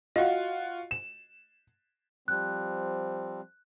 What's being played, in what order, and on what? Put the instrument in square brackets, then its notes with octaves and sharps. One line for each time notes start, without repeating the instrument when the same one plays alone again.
[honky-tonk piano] F4 F#4 [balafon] D#5 F5
[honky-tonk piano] E7
[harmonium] F3 G3 C4 [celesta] F#6